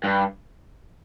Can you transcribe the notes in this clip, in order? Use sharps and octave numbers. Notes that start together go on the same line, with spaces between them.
G2